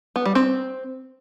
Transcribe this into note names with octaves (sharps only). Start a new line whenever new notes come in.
B3
G3
C4